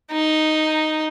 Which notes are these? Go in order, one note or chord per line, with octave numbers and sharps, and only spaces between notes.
D#4